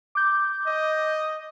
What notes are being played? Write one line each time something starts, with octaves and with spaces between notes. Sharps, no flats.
D6 G6
D#5